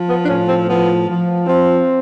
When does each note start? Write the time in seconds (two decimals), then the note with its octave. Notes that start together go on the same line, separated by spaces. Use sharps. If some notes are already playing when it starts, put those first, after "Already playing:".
Already playing: F3
0.09 B3
0.24 D4
0.28 A2 C#4
0.49 C4
0.68 F3 B3
1.07 F3
1.46 F3 C4